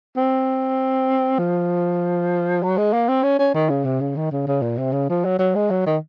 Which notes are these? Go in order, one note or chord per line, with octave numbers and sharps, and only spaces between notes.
C4
F3
F#3
G#3
A#3
C4
C#4
C#4
D#3
C#3
C3
C#3
D#3
C#3
C#3
A#2
C3
C#3
F3
F#3
F#3
G#3
F#3
D#3